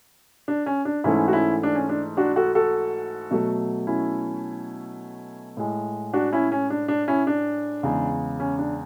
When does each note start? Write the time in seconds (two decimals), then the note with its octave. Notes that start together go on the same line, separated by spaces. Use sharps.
0.48 D4
0.66 C#4
0.85 D4
1.04 G#2 E3 A3 C#4 E4
1.28 F#4
1.33 C#4 E4
1.63 D4
1.75 C#4
1.89 D4
2.17 D4 F#4
2.36 F#4 A4
2.55 F#4 A4
3.31 B2 F#3 A3
3.87 C#4 E4
5.57 A2 G#3
6.13 D4 F#4
6.32 C#4 E4
6.52 C#4
6.70 D4
6.88 D4
7.08 C#4 E4
7.27 D4
7.83 E2 C#3 G#3
8.40 C#4
8.59 D4